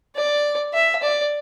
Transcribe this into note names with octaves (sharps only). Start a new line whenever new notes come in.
D5
E5
D5